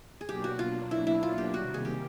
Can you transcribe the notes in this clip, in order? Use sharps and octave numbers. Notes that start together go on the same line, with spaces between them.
G#4
B2 F#3 A#3 D4 G4
F#4
F4
B2 F#3 A#3 D4 E4
E4
F4
G4
C3 D#3 G3 A#3 F#4
G#4
G4